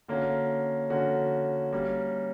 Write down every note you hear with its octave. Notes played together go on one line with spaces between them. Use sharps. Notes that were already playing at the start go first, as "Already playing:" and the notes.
D3 A#3 C#4 F#4
D3 A#3 C#4 F#4
G3 A#3 C#4